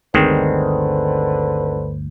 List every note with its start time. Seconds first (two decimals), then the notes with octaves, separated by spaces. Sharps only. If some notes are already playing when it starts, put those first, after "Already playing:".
0.14 G1 D2 D3 D#3 G#3 C4 B4 C5